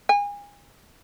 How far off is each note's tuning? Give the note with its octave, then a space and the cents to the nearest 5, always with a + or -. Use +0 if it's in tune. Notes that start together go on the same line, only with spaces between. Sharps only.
G#5 -30